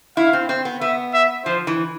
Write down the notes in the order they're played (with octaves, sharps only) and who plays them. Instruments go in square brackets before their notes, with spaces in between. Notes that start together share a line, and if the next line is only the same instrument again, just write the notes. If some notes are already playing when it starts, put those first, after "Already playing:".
[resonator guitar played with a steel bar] E4 [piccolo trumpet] F5
[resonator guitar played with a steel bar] C4
C4
B3
[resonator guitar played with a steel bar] B3 [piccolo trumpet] E5
[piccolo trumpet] E5
[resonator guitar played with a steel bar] F3 [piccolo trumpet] C5
[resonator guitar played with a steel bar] E3